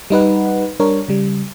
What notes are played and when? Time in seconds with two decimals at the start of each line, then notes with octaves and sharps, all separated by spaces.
0.10 G3 D#4 B4 F#5
0.80 G3 D4 A#4 C#5
1.08 C#3 G3